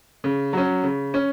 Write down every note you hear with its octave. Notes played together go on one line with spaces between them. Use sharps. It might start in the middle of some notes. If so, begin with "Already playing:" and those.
C#3
F#3 C#4
C#3
C#4